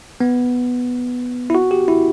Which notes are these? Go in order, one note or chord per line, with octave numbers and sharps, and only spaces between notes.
B3
E4
F#4
G4
E4